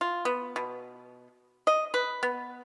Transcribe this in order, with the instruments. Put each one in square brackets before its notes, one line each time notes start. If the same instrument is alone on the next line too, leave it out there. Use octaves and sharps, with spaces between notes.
[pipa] F4
B3
B2
D#5
B4
B3